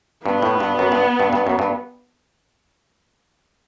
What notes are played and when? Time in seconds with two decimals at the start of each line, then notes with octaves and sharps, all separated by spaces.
0.25 G2 B3
0.42 A2
0.60 G2
0.79 F#2
0.92 G2
1.20 G2
1.33 G2
1.47 F#2
1.59 G2